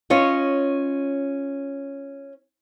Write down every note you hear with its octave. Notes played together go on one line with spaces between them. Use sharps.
C#4 F4 C#5 D#5